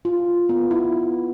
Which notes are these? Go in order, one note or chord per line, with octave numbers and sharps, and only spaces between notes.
F4
B3
E4